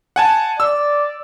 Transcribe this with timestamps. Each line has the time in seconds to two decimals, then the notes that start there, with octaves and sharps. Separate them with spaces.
0.16 F#5 G#5 A5
0.60 D5 E6